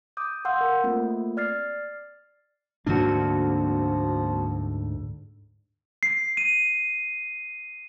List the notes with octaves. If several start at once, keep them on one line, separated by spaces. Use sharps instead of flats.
D6 D#6 G6
F5 F#5 C6 E6 G6
A#4
A3 A#3 C4 F4
D5 F6 A6 C7
D2 G#2 D3 F3 A#3 C4 D4 F#4
C7
D#7